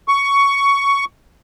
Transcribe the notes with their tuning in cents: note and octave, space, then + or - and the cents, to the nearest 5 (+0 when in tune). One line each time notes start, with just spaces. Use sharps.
C#6 +10